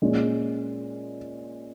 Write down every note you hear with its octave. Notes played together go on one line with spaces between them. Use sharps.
A#2 G#3 C#4